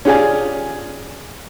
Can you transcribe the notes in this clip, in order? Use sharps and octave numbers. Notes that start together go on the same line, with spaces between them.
C#4 F4 G4 G#4 D5 G#5